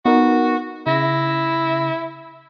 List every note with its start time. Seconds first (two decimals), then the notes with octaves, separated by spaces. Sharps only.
0.05 B3 D#4 F#4 A#4
0.86 C#3 E4 A#6